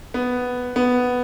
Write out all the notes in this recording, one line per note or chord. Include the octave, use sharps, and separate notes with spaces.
B3
B3